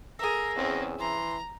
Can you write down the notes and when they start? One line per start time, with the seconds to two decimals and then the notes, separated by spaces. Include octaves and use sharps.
0.19 G#4 A#4 E5 A#6
0.56 E2 C4 C#4
0.99 E3 A#5 C6